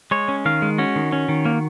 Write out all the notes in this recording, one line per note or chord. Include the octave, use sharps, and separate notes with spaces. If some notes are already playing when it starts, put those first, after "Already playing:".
G#3 C#5
C#4
D#3 F5
G#3
C#4 F#4
D#3
C#4
D#3
A#3